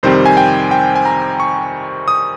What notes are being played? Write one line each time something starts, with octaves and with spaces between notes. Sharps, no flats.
F2 C3 D#3 G3 C4 C5
G#5
G5
G5
G#5
A#5
C#6
D#6